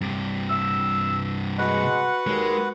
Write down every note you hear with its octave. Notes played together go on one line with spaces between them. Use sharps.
G2 C3
E6
G#3 F#4 B4 F#5
D#2 G#3